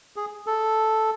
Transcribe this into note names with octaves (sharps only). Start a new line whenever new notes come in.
G#4
A4